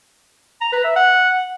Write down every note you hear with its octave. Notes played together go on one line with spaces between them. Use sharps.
A#5
B4
E5
F#5